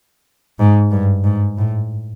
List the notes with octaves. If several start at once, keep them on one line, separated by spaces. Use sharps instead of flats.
G#2
G2
G#2
A2